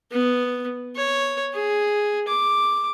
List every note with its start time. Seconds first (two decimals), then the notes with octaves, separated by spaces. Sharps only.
0.12 B3
0.96 C#5
1.54 G#4
2.28 D6